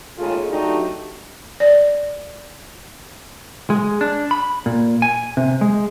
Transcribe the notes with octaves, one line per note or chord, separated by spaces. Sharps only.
D#2 C#3 G#3 A3 F4 A4
F#3 A3 D4 D#4 F#4 G4
D5
G#3
D4
B5
A#2
G#5
C3
G#3